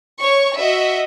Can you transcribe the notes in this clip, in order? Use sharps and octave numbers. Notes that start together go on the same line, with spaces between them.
C#5 C#6
F#4 D#5 E5